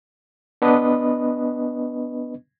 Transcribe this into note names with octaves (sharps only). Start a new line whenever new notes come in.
B3 D4 B4 D#5